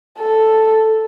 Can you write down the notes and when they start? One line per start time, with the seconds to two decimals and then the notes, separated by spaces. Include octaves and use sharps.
0.19 A4